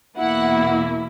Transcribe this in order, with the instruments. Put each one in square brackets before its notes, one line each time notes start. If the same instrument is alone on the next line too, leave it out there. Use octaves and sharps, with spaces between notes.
[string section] E2 B2 A#3 E4 F#5